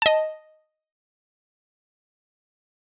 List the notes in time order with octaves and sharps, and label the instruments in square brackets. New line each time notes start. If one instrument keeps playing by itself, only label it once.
[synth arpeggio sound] D#5 A5